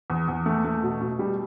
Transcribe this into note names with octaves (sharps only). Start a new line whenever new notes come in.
E2
E2
A3
A3
B2
B2
G3